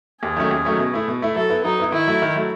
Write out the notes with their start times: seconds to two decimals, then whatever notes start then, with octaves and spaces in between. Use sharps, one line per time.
0.22 D#2 G#4
0.37 D#3 F#3 A3 C#4
0.51 D#2
0.65 D#3 F#3 A3 C#4
0.79 B2
0.93 A3 E4
1.08 B2
1.22 A3 E4
1.35 F#3 A4
1.50 B3 E4
1.64 F#3 D#4
1.79 B3 E4
1.92 D#3 E4
2.07 F#3 A3
2.22 D#3
2.35 F#3 A3